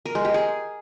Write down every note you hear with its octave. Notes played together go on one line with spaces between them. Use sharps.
A#4
G#3
G4
G#4